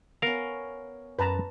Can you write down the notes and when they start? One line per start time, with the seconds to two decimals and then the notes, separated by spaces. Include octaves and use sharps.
0.22 B3 C#4 A#4 F5
1.19 F#2 B4 A5 A#5